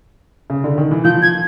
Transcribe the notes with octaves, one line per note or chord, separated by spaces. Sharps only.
C#3
D3
D#3
E3
F3 G6
G#6